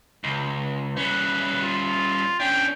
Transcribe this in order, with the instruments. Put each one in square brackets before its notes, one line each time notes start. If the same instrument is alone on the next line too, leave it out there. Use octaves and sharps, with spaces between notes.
[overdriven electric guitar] C#2
[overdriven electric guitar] G3 C#4 [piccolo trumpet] B4
[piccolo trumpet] F4
[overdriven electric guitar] C#4 D4 [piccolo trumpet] G5